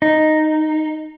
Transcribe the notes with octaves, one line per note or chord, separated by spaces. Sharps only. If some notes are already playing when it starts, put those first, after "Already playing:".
D#4